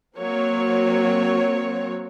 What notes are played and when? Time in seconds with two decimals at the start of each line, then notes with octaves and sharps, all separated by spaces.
0.18 F#3 A#3 C4 C#5